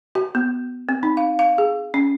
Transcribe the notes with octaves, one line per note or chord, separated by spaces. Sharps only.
F#4
B3
C4
D#4
F5
F5
G#4
C#4